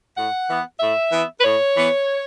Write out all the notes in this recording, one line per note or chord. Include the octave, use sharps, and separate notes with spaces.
A2 F#5
E3 B3
A2 E5
E3 B3
B4
A2 C#5
E3 B3